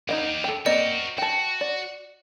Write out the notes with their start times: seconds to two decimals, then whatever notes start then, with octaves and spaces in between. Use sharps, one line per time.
0.09 A#3 D#4 G4 D#5 F#5
0.44 A4 G5
0.66 A#3 C4 F#4 A#4 D5 D#5
1.18 F#4 G5 A5
1.61 D5